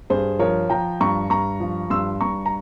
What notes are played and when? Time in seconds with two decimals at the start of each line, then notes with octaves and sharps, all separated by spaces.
0.10 G2 G#4 C5
0.39 F3 A#4 C#5
0.70 F3 G5 A#5
1.00 G2 A#5 C#6
1.30 G2 A#5 C#6
1.60 F3
1.90 G2 C6 E6
2.20 G2 A#5 C#6
2.46 A#5